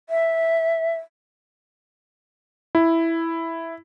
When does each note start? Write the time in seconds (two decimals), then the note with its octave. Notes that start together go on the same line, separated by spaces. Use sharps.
0.10 E5
2.75 E4